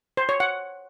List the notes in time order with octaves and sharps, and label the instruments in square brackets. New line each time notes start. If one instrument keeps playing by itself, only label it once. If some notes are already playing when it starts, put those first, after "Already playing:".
[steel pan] C5
C#5
F#5